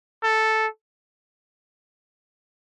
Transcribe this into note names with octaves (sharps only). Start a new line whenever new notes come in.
A4